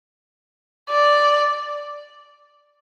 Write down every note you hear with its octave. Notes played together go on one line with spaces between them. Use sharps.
D5